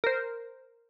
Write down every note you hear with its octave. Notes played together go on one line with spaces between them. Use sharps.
A#4 C5